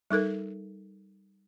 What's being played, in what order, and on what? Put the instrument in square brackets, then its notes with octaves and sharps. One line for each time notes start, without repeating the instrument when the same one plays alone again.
[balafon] G3 D#4 A4 A#4